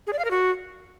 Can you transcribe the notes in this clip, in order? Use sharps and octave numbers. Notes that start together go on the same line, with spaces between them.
G#4
D5
F5
A#4
F#4